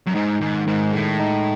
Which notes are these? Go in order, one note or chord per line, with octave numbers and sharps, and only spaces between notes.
F#2
G#2 D#4
G#2 D#3
G#2 D#3
A2 G#3
D#4